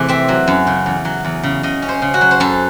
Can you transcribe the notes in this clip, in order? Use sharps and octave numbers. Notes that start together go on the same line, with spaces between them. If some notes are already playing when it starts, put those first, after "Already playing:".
Already playing: C3 E3 A3 G#4
C4 E5
F#3
F#2
C#3
E2
F#3
E2
C#3
C#3 D#5
C#4
C5
C#3
F#4
F#3
C5
F#2 A4